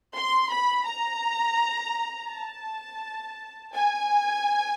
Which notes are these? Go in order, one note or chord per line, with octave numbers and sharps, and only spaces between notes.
C6
B5
A#5
A5
G#5